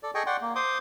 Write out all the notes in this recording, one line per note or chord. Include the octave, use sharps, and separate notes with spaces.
A4 D5
G#4 A4 D#5 G5 G#5 C#6
D5 F#5 G5 C6 C#6
A#3
C5 C6 D6 D#6